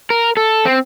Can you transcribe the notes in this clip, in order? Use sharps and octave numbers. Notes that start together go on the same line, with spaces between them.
A#4
A4
C4